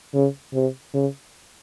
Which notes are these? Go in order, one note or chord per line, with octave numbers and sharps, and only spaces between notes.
C#3
C3
C#3